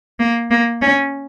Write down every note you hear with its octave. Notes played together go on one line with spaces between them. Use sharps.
A#3
A#3
C#4